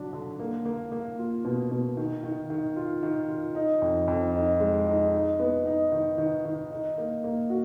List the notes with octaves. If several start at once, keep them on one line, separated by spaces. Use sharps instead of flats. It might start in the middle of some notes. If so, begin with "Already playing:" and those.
Already playing: D3 F#3 D4
D3
A#3
A#3
A#3
F4
B2
B2
D#3
D#3
D#3
F4
D#3
F4
D#4
F2
F2
D#4
G#3
D#4
D#4
B3
D#4
D#3
D#3
D#3
D#4
A#3
A#3
F#4